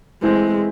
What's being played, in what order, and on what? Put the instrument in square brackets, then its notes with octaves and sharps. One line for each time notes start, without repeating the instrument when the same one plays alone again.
[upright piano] E3 A3 C4 E4 C5 [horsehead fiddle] G#3